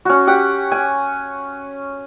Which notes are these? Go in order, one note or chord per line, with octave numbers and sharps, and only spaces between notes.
C#4 F#4
G4 F#5
G#5